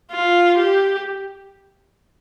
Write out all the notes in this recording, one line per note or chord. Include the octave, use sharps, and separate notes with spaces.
F4
G4